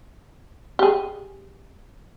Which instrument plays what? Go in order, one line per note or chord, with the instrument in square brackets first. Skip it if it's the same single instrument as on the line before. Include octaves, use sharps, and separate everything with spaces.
[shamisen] G4 G#4